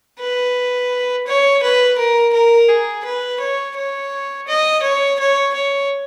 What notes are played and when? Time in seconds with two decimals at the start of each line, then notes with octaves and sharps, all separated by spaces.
0.20 B4
1.27 C#5
1.63 B4
1.98 A#4
2.34 A#4
2.69 G#4
3.05 B4
3.41 C#5
3.76 C#5
4.47 D#5
4.83 C#5
5.19 C#5
5.54 C#5